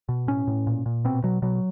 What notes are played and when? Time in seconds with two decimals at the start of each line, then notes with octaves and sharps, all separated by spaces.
0.09 B2
0.28 A2 C#4
0.47 A2
0.67 A#2
0.86 A#2
1.05 B2 C4
1.23 B2 F#3
1.42 B2 F#3